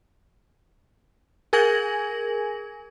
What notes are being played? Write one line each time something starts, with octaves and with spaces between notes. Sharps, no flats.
G#4 A#4 G#5 G#6 A#6 F#7